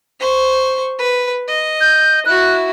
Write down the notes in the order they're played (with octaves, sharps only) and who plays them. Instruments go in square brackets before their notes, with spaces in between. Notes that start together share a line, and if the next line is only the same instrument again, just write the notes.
[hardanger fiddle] C5 C#6
B4
D#5
[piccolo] G6
[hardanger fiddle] E4 F#4 [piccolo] F#6